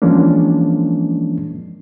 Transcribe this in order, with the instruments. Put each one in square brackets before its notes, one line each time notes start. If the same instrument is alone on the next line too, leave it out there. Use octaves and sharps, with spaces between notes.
[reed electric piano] E3 F3 G#3 A#3 C#4 D4